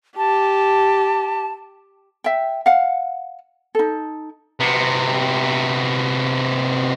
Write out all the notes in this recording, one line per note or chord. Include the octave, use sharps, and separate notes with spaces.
G4 A5
E5 G5
F5 F#5
D#4 A4
C3 B3